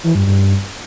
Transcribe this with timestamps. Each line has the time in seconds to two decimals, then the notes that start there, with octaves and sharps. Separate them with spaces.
0.04 E3
0.15 G2
0.26 G2